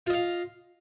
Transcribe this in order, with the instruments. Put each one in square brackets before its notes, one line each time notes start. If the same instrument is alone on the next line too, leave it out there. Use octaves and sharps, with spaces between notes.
[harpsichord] F4
D#5
F5